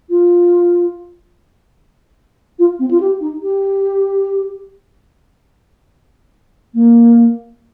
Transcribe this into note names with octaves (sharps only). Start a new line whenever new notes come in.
F4
F4
C4
F4
G4
D#4
G4
A#3